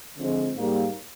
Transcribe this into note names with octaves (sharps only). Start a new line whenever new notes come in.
D3 F3 G#3 C4
G#2 G3 A#3